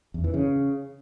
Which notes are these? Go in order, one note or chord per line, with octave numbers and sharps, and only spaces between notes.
E2
E3
C#3